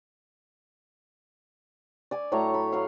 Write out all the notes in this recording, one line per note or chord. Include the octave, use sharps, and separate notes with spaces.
D5 G#5
A2 F#3 C#5 A#5
B5
F#3 F5